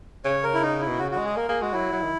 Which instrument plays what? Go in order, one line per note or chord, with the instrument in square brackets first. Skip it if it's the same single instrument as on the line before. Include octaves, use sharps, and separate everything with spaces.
[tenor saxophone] C#3 [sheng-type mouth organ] C#5
[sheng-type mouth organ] A#4
E4
D#4
E4
[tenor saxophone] B2
[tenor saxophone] C#3 [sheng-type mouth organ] F#4
[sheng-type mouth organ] F#4
[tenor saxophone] G#3
[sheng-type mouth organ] G#4
[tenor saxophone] A#3 [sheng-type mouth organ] A#4
[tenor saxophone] A#3 [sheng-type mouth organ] G#4
[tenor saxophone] G#3 [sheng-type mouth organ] F#4
[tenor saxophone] F#3 [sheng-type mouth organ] E4
[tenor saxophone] F#3
D#3